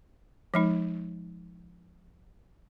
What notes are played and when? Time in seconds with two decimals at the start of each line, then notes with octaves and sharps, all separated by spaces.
0.54 F3 G#3 D#4